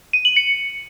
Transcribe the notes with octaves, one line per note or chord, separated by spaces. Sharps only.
D#7
F#7
C#7